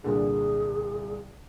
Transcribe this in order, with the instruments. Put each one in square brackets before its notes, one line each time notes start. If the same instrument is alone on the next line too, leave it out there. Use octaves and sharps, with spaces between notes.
[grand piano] C2 A#2 D3 [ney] G#4